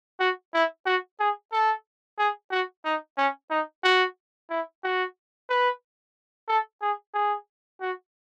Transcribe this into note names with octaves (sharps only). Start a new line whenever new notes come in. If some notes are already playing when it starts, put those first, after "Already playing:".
F#4
E4
F#4
G#4
A4
G#4
F#4
D#4
C#4
D#4
F#4
E4
F#4
B4
A4
G#4
G#4
F#4